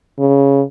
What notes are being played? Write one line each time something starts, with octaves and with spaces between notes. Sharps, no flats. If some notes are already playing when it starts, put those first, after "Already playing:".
C#3